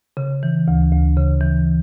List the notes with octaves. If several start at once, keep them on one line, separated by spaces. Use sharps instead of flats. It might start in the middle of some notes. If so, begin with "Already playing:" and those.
C#3
E3
D2
D2
C#3
E3